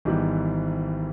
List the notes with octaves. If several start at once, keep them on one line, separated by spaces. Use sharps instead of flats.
G#1 G#2 E3 G3 B3